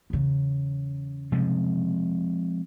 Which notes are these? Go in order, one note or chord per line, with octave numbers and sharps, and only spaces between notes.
E2 C#3
C3 F3 G#3